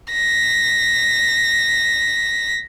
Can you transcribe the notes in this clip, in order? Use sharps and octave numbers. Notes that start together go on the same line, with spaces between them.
A#6 B6